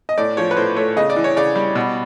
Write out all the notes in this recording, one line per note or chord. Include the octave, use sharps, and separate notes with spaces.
D#5
A2 D5
F3 C#5
B4
A2 C5
A3 C#5
C#3 D#5
D5
E3
C#5
C#3 D5
G3
B2